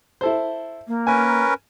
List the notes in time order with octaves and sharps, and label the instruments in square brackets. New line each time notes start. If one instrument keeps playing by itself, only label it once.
[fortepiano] E4 A4 C5
[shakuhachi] A#3
[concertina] C#4 A#4 B4 [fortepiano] G#5